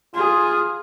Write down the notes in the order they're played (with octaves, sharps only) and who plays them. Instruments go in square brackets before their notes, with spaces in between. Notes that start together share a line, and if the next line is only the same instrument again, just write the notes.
[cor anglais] F4 [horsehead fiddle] G#4